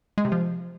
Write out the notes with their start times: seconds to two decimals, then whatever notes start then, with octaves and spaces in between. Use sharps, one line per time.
0.18 G#3
0.25 C3
0.32 F3